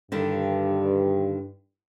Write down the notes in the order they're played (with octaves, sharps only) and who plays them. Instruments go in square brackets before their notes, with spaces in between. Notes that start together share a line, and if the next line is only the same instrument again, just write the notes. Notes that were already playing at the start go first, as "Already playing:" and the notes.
[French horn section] G2 [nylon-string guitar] D3 D#3 G3